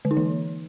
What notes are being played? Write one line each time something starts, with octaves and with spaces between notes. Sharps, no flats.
D3
D#4
E3